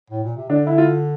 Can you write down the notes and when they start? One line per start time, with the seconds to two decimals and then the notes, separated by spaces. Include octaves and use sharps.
0.10 A2
0.24 A#2
0.36 C3
0.49 D3 D4
0.67 E4
0.78 F4